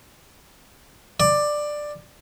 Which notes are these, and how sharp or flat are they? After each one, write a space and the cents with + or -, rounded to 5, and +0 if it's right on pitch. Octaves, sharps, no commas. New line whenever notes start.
D5 +10